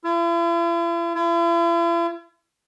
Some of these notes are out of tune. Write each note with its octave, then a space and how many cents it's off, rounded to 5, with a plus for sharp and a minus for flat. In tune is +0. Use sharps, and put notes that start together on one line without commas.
E4 +45
E4 +45